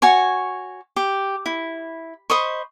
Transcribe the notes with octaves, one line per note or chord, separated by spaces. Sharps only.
F#4 C#5 G#5 C#6
G4
E4
C5 D#5 B5 C#6